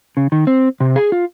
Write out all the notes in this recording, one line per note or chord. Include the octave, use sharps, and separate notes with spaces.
C#3
D#3
C4
C3
G#4
F4